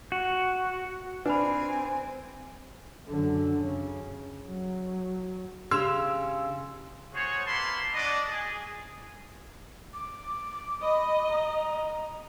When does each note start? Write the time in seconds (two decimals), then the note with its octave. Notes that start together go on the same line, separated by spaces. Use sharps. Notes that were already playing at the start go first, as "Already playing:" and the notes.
0.12 F#4
1.26 C4 D4 B4 G#5 B5
3.08 F#2 D3
3.63 C#3
4.47 F#3
5.71 C#3 G4 C6 E6
7.14 F#4 G#4 C5 C#5
7.46 A#3 B3 E4 A5 B5 C6
7.94 D4 F#4 D5 D#5
8.29 G#4
9.94 D6
10.82 D#5 B5
11.29 A#5